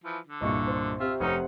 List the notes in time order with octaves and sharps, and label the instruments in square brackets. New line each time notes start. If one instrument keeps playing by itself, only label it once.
[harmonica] E3 F3
D3
[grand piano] C2 G2 A#2 [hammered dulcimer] D#5 C#6
[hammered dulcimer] C5
[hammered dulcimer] C3 [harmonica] F4 E5
[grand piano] F1 [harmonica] C#4 D#4 [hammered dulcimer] C5 F#5